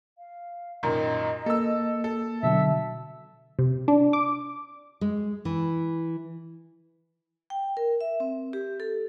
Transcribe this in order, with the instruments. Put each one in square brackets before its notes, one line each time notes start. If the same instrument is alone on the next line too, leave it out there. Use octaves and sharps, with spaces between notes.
[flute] F5
[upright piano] F#2 A#2 D#3 [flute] D#5
[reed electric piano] A#3 [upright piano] A4 E6
[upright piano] A4
[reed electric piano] B2 D3 F#3 [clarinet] E5 [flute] A5
[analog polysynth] C3
D4
D6
[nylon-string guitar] G#3
E3
[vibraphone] G5
A#4
E5
C4
G4
A4